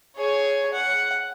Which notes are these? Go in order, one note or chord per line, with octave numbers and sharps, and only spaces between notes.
G#4 C#5
F#5